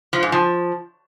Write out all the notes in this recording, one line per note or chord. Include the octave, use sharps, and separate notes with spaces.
F3
G#2
F3